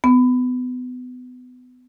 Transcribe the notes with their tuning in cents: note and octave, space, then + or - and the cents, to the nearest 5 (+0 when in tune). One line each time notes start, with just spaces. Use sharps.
B3 +25